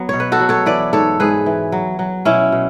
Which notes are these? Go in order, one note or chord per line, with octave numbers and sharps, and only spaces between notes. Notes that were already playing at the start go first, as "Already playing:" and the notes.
Already playing: F#3 B3
B2 C#5
B4
F#4 A4
F#3
A4 C#5
E3 B4 D5
G#2 A4 C#5
G#2 G#4 B4
E3
F#3
F#3
B2 C#4 E4
B2